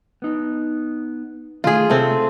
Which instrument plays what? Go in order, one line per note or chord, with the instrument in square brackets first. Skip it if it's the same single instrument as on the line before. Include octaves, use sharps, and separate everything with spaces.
[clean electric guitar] B3 D#4
[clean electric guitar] D#3 A3 [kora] F4 G#4
[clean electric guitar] C3 C#5 [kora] A3 C4